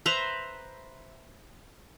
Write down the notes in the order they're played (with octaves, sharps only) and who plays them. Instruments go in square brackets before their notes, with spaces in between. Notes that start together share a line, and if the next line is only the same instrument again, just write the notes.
[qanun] B4 C5 E5 A#5